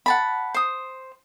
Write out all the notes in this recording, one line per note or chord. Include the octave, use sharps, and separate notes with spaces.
F#5 A5 B5
C5 D#6